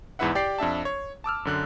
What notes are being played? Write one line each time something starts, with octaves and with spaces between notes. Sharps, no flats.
E2 G#2 E4 B4 E5 F#5
G4 D5 G5 C7
F2 D4 E5 A5
C#5
A5 D6 E6 F6
F#2 D3 F#6